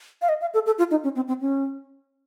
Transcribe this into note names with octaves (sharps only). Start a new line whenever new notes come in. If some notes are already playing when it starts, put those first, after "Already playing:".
F5
D#5
F5
A4
A4
F4
D#4
C#4
C4
C4
C#4